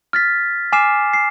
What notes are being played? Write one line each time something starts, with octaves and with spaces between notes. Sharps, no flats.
F6 A6 B6
G#5 D6 F6 C7 E7
C7